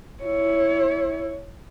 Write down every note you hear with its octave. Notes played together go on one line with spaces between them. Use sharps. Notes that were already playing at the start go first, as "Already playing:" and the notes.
E4 C#5